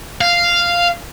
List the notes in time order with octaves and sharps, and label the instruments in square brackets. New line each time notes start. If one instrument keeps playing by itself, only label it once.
[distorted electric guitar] F5